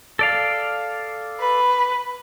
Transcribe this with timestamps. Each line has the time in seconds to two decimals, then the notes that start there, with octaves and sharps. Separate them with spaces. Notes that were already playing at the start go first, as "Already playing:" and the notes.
0.19 A4 D5 F5
1.40 B4